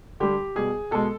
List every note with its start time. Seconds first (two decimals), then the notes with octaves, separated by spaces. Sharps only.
0.20 D3 G3 G4
0.55 B2 G3 G#4
0.91 B2 G#3 A4